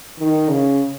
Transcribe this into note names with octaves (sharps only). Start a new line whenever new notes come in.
D#3
C#3